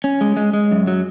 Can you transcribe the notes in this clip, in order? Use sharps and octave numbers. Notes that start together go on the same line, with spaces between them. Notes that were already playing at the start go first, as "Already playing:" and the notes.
C#4
G#3
G#3
G#3
F#2
F#3